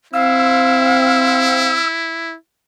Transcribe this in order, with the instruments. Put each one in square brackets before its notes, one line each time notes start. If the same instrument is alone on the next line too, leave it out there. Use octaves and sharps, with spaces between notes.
[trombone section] C4 [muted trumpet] E4 [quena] F5 [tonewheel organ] E6